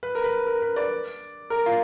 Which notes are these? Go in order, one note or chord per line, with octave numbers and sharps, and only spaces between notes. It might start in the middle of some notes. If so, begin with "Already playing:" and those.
B4
A#4
B4
A#4
B4
D5
A#4
F4